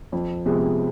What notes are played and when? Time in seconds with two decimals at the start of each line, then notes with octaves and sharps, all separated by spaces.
0.12 F2
0.46 C3 F3 G#3 B3